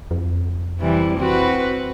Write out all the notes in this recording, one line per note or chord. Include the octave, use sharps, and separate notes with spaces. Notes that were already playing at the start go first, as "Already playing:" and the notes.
F2
C3 E3 G3
C4 F#4 B4